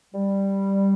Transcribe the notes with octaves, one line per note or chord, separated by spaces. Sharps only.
G3